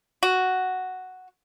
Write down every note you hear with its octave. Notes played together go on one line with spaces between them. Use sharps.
F#4